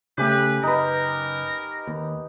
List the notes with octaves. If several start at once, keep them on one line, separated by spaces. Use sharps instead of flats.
C#3 A3 G4 B4 G#5
F#1 D#4 A#4 B4
D#2